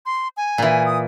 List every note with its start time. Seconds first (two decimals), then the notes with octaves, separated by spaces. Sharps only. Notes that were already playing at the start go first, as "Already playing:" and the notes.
0.06 C6
0.37 G#5
0.58 A#2 E3
0.86 D#6